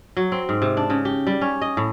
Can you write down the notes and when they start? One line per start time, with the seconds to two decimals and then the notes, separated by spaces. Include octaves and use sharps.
0.17 F#3
0.32 C4
0.49 G#2
0.62 C3
0.77 D4
0.90 C#3
1.05 G4
1.27 G3
1.41 C#4
1.62 D#5
1.77 A2